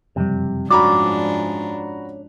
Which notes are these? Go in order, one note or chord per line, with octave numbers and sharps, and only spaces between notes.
F#1 F2 C3 G3
G#2 F3 C#4 D4 F#4 D5 A#5 B5